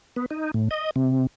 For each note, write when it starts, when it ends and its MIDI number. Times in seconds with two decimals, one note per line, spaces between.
0.16 0.26 59
0.31 0.51 63
0.54 0.69 45
0.71 0.91 75
0.96 1.27 48